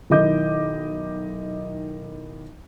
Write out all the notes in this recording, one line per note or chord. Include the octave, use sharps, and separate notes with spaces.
B1 D#3 E4 D#5 D6 G6